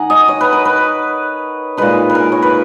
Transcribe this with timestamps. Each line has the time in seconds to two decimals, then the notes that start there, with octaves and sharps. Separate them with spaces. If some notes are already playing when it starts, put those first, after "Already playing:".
Already playing: D#3 D#4 F#5 G#5 A#5
0.10 D#5
0.28 C#5
0.41 B4
0.52 A#4
0.65 B4
1.77 A#2 G#3 D#4 B4
2.10 B4
2.15 A#4
2.32 C#5
2.42 B4